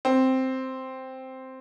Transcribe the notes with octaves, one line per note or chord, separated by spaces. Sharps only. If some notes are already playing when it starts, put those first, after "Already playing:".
C4